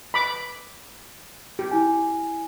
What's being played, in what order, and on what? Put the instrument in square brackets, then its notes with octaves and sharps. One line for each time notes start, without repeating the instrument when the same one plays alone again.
[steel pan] B5 D6
G4
[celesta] E4 G#5